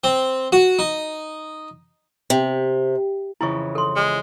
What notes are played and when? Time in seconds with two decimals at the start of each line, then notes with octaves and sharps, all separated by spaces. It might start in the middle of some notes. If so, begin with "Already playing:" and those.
0.04 C4
0.52 F#4
0.79 D#4
2.30 C3
3.41 F2 C#3 E3 E4 C#6
3.75 A4 C6
3.96 G#3